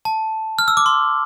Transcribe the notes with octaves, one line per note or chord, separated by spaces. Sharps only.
A5
F6
E6
D6
C6